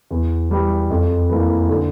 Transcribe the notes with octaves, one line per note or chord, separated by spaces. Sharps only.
E2
E3 G3
F2
E3 A#3
D3